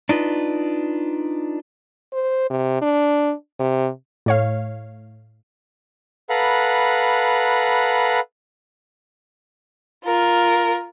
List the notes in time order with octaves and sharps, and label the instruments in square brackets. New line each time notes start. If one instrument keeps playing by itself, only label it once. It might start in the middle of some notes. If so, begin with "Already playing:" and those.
[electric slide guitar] D4 D#4 F4 B4
[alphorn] C5
C3
D4
C3
[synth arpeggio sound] A2 C#5 F5
[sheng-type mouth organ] A4 B4 F5 F#5 A#5 B5
[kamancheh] F4 A#4